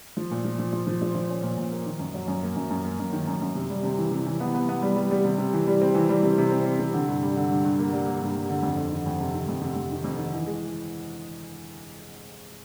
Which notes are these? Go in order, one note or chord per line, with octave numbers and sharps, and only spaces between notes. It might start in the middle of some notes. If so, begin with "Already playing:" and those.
F3
A#2
F3
F3
F3
F3
F3
F3
C#4
A#2
A#2
A#3
D#3
F#2
F#3
F#2
A#3
F#2
F#2
A#3
F#2
D#3
F#2
F#2
C3
G3
C3
E3
C3
E3
B3
B3
B3
G3
G3
G3
C3
C3
E3
G3
C4
E3
G3
C3
C3
C4
C4
C3
D3
G2
G3
D3
G2
G2
A#3
G3
A#3
G2
G2
D3
F2
F2
D#3
F2
C3
D#3
F2
C3
F2
D#3
F2
D#3
E3
G#3